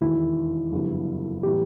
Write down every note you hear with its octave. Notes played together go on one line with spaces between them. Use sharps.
E1 D#2 D#3 E4
F#1 F2 D3 G3 B3
A2 E3 G3 B3 G4